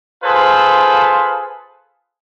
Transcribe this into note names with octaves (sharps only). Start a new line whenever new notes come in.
F4 G#4 A4 B4 C5